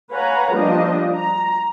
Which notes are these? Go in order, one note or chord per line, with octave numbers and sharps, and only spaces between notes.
B4 C#5 F5 F#5 G#5 A#5
F3 G3 A#3 D4 D#5
A#5